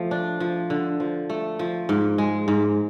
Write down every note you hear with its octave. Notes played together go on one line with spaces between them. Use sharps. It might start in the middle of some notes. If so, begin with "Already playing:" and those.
Already playing: F3 A3
D4
F3
D3
F3
A3
F3
G#2
G#3
G#2